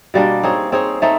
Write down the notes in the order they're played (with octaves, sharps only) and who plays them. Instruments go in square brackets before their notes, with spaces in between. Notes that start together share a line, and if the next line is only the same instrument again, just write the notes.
[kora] B2 G3 A#3 D4
C4 D#4 G#4 C#5
C4 D#4 G#4 C#5
A3 C4 D#4